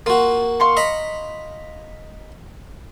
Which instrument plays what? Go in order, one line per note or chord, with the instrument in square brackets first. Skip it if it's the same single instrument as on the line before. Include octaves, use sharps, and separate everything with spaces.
[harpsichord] A#3 F#4 [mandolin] F4
[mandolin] F5 C6 C#6
[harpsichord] D#5 A#5 B5